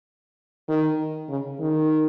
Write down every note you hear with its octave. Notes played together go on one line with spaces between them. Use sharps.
D#3
C#3
D#3